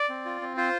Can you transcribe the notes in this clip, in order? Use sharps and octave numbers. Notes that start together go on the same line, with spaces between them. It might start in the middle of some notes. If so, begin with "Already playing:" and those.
Already playing: D5
C4
F4
C4
F4 C5